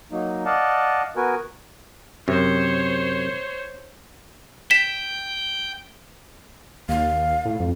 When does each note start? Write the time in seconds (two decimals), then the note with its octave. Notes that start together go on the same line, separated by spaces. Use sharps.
0.12 F#3 A#3 D#4
0.46 D5 D#5 F5 F#5 A5
1.16 B3 F#4 A#4 B4 G#5
2.28 F#2 C3 C5 C#5
4.71 G5 B6 E7
6.89 D#2 F5
7.46 A2
7.60 F2